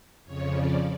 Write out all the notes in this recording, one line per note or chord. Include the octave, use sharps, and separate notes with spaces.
F2 C#3 F3 C#5
D5